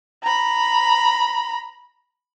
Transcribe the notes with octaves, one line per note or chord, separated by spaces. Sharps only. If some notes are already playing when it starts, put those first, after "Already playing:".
A#5 B5